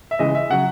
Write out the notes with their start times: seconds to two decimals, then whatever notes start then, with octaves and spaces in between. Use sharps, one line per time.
0.11 E5
0.19 C#3 E3 G#3 D#5
0.35 E5
0.50 C#3 F#3 F#5